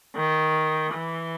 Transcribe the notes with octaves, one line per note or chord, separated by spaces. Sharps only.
D#3
E3